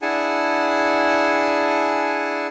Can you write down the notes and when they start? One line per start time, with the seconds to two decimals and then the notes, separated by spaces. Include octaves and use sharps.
0.02 D4 E4 G#4 F#5 G#5 A5